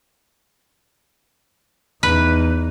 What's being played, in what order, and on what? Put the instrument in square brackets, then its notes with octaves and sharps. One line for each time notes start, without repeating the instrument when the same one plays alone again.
[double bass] E2 D#4 [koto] B4